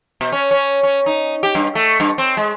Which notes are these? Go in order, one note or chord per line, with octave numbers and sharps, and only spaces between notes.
B2
C#4
C#4
C#4
D#4
G4
G2
A3
G2
C4
G#3